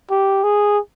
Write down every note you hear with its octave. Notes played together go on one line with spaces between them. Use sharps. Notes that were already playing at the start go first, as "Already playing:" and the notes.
G4
G#4